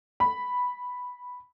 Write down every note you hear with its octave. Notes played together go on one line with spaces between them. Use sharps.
B5